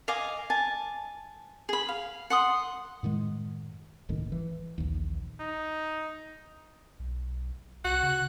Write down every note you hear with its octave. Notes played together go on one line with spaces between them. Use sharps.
D#5 F5 G#5 D6
G#5 A5
G#4 B5
F5
F#5 C6 D#6
F#2 A2 D#3 G#3
F#1 C#2 A2 D#3
E3
A#1 D#2
D#4
B1
C2 F#4 F#6
C#3